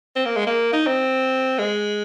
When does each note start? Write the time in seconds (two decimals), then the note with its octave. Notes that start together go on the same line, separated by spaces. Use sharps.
0.16 C4
0.25 A#3
0.36 G#3
0.47 A#3
0.73 D#4
0.87 C4
1.58 G#3